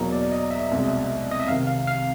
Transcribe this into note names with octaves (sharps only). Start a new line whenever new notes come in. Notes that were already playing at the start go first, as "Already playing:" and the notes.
Already playing: E2 B2 F#3 A#3 D#4
D5
D#5
E5
C2 B2 G#3
D#5
E5
C2 C3 D#3 F5
F5
F5